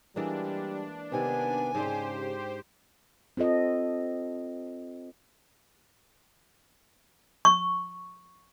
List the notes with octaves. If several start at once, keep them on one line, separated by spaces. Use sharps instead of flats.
E3 G3 G#3 A#3 D4
C3 D#3 B3 G#5
G#2 C#3 D4 G4 C5
C4 F4 A4 D#5
C#6